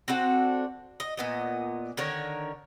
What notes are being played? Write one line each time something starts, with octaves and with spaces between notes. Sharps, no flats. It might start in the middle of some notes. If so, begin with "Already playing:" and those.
C4 D4 F#4 A4
D#5
A#2 B3 D#5
D3 D#3 A#4 C#5